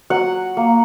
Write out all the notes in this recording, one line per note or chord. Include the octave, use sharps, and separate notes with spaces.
F#3 F#5
A#3